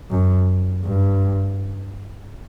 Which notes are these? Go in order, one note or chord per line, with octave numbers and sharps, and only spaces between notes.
F#2
G2